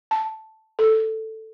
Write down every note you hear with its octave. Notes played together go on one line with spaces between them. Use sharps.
A5
A4